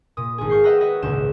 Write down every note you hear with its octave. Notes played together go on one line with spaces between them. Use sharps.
A#2 D#6
G#1 G#4
F5 C#6 G6 C7
B4 D#5 E5 F#5 G5 A#5
F#4 B4 C#5 D#5 E5
G#1 C#2 A#2 C#4 G6 E7